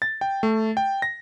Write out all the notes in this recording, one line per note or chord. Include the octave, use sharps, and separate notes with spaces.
A6
G5
A3
G5
A#6